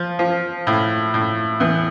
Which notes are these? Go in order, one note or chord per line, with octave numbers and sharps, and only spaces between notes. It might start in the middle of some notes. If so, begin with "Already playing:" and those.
Already playing: F3
F3
A2
A2
E2